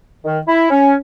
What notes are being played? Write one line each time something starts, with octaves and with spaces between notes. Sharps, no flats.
D#3
E4
C#4